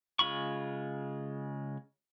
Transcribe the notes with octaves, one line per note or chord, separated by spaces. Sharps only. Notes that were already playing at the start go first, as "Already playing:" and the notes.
C#3 G#3 F4 B5 C#6